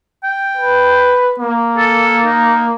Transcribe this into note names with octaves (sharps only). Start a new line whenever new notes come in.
G5
B4
A#3
A4
D#4